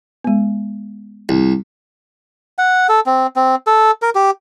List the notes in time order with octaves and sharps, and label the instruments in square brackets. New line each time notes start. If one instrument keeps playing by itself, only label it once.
[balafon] G#3 B3
[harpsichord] C2
[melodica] F#5
A4
C4
C4
A4
A#4
G4